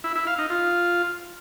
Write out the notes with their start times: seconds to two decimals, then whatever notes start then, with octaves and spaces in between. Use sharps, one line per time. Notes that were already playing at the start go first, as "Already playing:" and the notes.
0.04 E4
0.15 E4
0.27 F5
0.38 D#4
0.50 F4